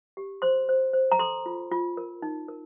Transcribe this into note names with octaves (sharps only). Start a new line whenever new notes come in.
G4
C5 C6
C5
C5
A#5
A4 C6
F4
F4
A#4
D#4
A#4